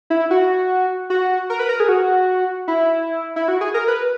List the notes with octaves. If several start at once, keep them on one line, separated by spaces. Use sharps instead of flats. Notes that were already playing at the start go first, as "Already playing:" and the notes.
E4
F#4
F#4
A#4
B4
A#4
G#4
F#4
E4
E4
F#4
G#4
A#4
B4